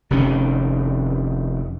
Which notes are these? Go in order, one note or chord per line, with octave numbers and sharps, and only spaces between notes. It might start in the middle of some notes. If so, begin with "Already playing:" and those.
F1 C3 D#3 C#4